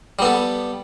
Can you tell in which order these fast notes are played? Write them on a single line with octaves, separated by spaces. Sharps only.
G3 B3 A4